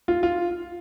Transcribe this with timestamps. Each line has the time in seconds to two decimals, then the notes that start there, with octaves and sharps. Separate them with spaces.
0.08 F4
0.23 F4